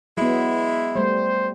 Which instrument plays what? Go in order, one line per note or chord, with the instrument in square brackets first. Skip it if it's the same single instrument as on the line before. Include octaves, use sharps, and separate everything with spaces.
[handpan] F#3 B3 [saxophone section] G#3 E4
[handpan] G3 A3 [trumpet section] C5